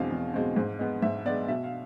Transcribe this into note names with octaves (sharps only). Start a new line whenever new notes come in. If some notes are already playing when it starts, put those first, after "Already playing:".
Already playing: E2 B2 G#3 C4 F5
E2
B2 G#3 C4
G#2
G#3 B3
G#2 E5
G#3 B3 D5
B2 E5
F5